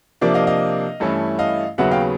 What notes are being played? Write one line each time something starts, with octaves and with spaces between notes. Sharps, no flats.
C3 F3 A#3 D4 D5 E5
D#5 F5
D#5 F5
G2 E3 A3 C#4 E4
D#5 F5
D#2 C#3 F#3 B3 E5 F#5
F5 G5